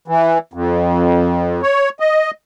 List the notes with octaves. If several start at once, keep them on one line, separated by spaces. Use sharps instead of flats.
E3
F2
C#5
D#5